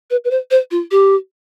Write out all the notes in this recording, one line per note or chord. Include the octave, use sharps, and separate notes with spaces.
B4
B4
C5
C5
F4
G4